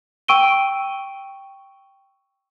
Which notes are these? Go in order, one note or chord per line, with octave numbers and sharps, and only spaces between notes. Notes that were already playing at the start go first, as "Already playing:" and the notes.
G5 C#6 E6 D7 D#7 G7